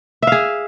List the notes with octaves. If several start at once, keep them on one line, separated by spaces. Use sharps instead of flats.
G#4 E5 F5